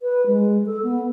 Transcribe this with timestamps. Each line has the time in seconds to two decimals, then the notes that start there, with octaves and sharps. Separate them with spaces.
0.01 B4
0.27 G#3
0.66 A4
0.83 B3